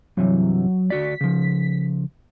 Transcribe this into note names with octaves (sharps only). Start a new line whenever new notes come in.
G2 C3 E3 F#3
D2 F#4 D5 B6
C#3 F3